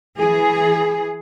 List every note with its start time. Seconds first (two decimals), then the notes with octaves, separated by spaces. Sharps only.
0.18 E3 G#4